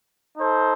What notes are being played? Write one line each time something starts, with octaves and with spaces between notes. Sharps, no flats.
D#4 A4 C5